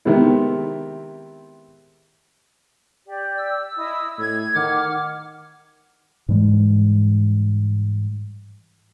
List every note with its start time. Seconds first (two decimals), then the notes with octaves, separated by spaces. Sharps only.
0.05 C3 D#3 G#3 B3 C4 E4
3.07 G4 D5
3.38 E6
3.77 E4 D#5 D#6
4.18 A2 G#6
4.55 D#3 F#5 D6 F6
6.29 G#2 E3 G3 G#3